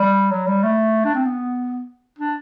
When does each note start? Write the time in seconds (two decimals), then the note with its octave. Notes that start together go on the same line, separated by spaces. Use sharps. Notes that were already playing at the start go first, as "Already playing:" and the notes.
Already playing: G3
0.32 F#3
0.47 G3
0.63 A3
1.05 D4
1.15 C4
1.25 B3
2.19 D4